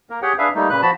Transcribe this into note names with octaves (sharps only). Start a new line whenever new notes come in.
A#3 A#4
G4 G#4 C#5 F#5 G5
D4 G#4 B4 E5 F5
G3 A3 A#3 D#4
A#2 C#3 B4 F#6
F3 F#4 A5 B5